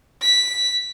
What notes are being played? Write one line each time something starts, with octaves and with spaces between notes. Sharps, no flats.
B6